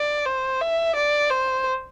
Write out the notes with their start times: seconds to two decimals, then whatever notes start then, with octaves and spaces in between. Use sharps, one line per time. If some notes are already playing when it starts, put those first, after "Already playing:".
Already playing: D5
0.26 C5
0.61 E5
0.95 D5
1.30 C5